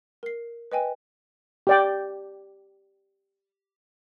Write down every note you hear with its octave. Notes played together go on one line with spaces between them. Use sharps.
A#4 C7
B4 D#5 G5 G#5
G4 D5 G5